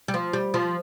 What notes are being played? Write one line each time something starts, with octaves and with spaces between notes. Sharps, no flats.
G3
F3
G3
F3